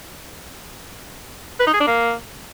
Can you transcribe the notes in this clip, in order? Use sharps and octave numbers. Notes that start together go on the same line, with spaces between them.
B4
D#4
G#4
D4
A#3